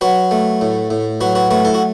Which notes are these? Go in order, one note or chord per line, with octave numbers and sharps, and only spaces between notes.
F#3 F#4 B4
A3
A2
A2
F#3 F#4 B4
F#4 B4
A3 F#4 B4
E4 A4
F#4